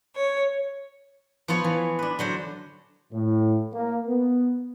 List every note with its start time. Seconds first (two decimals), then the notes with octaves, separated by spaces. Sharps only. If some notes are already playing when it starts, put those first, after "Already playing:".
0.14 C#5
1.48 F3 B3 F4 C#5
1.64 E3
1.99 D4 B4
2.19 D3 F#3 C5
3.12 A2
3.74 A#3
4.07 B3